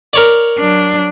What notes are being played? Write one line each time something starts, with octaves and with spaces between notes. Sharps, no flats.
A#4 C#5 D5
F#3 D4